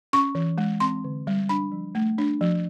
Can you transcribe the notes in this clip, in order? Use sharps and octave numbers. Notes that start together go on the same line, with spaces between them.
C#4 C#6
E3
G#3
C4 C6
D3
G3
D4 B5
F3
A3
D4
F3